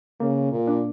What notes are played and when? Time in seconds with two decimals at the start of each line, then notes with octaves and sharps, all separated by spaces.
0.20 C#3 A#3
0.51 A#2
0.67 D4